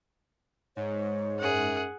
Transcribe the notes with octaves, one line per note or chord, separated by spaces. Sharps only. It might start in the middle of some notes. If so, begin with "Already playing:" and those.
G#2 C#5
F#2 G#4 F#5